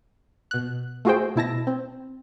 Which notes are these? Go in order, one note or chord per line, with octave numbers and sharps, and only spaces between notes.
B2 F#6
A3 F4 F#4 G#4 C5 G5
B2 E4 A5 A#6
C4